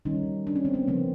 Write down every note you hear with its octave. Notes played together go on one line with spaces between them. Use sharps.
D#3 G3 A#3 C#4 D#4
D4
C#4
C4
B3 C#4
C#3 F3 A3 A#3 C4